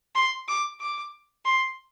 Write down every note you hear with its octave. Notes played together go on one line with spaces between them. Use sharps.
C6
D6
D6
C6